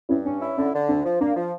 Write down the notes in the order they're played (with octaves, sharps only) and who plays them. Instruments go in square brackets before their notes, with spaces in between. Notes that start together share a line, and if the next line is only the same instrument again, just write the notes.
[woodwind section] G2 [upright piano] C#4 E4
[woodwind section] C#4 [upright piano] D4
[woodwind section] E4
[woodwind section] D3 [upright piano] C#4
[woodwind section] D3
[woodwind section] D2 [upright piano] D4
[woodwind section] F3
[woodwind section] A#3 [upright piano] D4
[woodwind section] F3